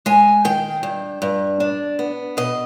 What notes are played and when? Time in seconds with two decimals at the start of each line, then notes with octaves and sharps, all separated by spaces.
0.06 G#3 G#5
0.45 D#3 G5
0.83 G2
1.22 G2
1.60 D4
1.99 B3
2.37 B2 D#5